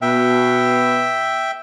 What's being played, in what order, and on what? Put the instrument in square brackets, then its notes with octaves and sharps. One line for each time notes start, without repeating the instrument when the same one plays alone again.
[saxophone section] B2 [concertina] E5 G5